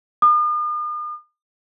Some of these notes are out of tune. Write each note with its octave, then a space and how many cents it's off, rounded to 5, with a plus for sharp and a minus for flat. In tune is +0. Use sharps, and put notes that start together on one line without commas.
D#6 -45